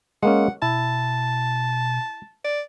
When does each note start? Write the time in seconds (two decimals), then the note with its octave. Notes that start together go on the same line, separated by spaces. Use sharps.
0.23 G#3 A#3 C#4 F#5
0.62 B2 E4 A5
2.45 D5